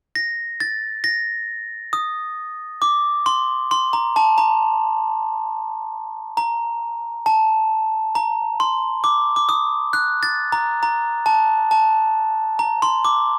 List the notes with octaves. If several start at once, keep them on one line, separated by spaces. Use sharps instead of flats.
A#6
A6
A#6
D#6
D6
C6
C6
A#5
A5
A#5
A#5
A5
A#5
C6
D6
D6
D#6
F#6
A6
A#5
A#5
A5
A5
A#5
C6
D6